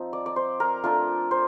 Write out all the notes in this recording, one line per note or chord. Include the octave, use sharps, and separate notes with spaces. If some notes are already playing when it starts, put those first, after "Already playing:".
Already playing: F3 C4 D#4
D5
D5
C5
A#4
A3 D4 F4 A#4
C5